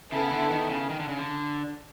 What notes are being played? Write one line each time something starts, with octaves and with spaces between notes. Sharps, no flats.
C#3 B3 E4 A4
D3
D#3
C#3
D#3
D3
C#3
D3